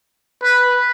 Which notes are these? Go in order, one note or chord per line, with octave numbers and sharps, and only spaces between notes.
B4